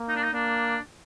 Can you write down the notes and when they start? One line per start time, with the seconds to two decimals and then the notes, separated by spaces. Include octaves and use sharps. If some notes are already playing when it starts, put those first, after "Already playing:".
Already playing: A#3
0.09 D#4
0.16 D4
0.23 D#4
0.33 A#3 D4